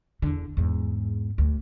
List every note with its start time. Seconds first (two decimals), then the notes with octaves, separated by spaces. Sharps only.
0.22 E2 D3
0.57 E2 G#2
1.38 D2